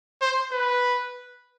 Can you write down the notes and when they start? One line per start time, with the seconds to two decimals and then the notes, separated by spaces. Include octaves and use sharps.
0.21 C5
0.52 B4